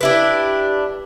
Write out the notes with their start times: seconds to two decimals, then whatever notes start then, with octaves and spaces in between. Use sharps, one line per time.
0.01 D4 E4 G4 B4